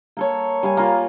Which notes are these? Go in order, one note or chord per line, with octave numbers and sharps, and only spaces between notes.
A#3 A4 C#5
G3 F5 G#5
A#3 F4